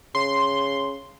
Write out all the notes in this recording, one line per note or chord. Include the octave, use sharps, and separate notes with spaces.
C#3 C6